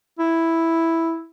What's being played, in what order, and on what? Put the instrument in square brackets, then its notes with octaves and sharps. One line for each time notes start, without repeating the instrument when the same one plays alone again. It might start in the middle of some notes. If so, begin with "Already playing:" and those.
[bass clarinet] E4